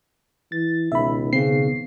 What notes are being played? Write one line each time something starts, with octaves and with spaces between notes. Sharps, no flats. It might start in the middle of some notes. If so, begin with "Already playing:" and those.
E3 A6
C#2 B2 D#3 E5 B5
C#3 B3 C4 C7